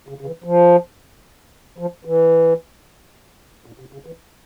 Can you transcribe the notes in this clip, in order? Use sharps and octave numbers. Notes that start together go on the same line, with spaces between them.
C#3
C#3
E3
F3
F3
E3
A#2
C3
C#3
E3